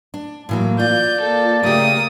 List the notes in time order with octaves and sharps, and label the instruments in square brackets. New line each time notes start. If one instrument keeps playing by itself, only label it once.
[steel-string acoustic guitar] D4
[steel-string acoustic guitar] A2 E3 F#3 [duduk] A#3
[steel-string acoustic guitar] F4 [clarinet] D5 [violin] G6
[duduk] A#3 [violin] A4
[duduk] C#3 [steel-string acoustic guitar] A3 G4 [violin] A#3 D#6